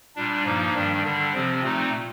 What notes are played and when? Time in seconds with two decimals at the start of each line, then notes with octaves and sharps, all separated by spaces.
0.16 A#2 G3 D4
0.45 G2 F3 A#3 D#4
0.75 G2 D#3 G3 D4
1.04 D3 G3 D4
1.33 C3 F3 C4
1.63 A#2 A3 C4 D#4